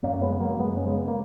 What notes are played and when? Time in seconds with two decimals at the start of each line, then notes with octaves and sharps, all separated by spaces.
0.03 F#2 A#3 C#4
0.13 A#3
0.22 G#3 B3
0.31 C#3
0.40 F#3 A#3
0.59 F#2 G#3 B3
0.76 C#4
0.86 C#3 G#3 B3
1.08 A#3